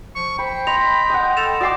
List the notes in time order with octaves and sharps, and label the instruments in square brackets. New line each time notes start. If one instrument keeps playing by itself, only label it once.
[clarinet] F3 [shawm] C#6
[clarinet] C5 [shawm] G5 [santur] B5
[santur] D#5 [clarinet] B5 [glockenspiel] C6 A#6 F7
[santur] D#5 F#5
[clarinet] A4 [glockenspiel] E7 F7
[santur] F#4 G5 D6 [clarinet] D5 [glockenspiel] D#6 C7